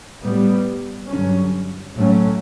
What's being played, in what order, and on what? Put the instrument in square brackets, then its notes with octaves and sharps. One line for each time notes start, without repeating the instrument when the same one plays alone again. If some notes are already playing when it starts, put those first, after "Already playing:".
[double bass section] A2 G3 B3
G2 D3 F#3 C#4
A2 F#3 A3 C#4